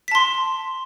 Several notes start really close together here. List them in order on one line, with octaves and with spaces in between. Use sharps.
B6 A5 C6